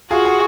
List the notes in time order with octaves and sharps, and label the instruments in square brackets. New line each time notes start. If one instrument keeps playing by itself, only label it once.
[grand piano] F4 G#4 [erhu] F#4
[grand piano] G#4